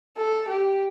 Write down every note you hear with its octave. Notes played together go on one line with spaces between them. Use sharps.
A4
G4